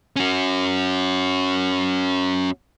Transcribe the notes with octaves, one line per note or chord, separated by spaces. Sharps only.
C#4 F#4